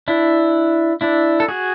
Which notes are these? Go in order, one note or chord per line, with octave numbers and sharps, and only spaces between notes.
D4 E4
D4 E4
A4
F#4 G#4